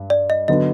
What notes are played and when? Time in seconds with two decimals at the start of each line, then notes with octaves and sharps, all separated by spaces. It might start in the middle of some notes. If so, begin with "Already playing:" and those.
Already playing: G2
0.10 D5
0.30 D#5
0.48 D3 F#3 B3 D#5